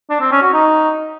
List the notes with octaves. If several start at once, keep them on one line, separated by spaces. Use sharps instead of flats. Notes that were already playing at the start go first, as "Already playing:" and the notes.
D4
C4
C#4
F#4
D#4